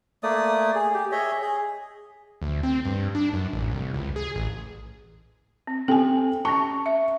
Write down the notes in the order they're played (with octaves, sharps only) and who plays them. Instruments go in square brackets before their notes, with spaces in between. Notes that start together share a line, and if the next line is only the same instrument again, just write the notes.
[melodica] A3 A#3 D5 D#6
G#4
G4
G#4 C#5 D#5 E5
G#4
[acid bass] D2
C4
G2
D4
F#2
A1
C2
C#2
G#4
A1
[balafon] C4
[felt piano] C4 G5 [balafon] A4 G#5
[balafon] C#4 A5 [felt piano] C#6
[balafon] E5